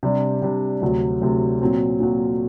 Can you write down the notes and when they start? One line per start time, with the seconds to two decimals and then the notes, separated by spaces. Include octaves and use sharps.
0.03 C3 G3 D4
0.42 C3 G3 D4
0.81 D2 C3 F#3
1.21 D2 C3 F#3
1.61 A#2 F#3 C4
2.00 A#2 F#3 C4